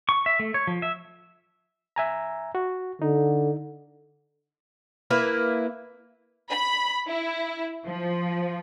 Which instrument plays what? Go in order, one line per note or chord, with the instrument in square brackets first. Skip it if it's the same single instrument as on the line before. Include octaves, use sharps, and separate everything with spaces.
[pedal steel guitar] C#6
E5
A3
C#5
F3
E5
[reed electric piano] E5 G#5 A#5
F#4
[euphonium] D3 [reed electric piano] D#4
[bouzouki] A#3 E4 B4
[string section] B5
E4
F3